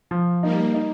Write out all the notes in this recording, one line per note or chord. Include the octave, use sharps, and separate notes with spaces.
F3
G3 A#3 D#4
D#4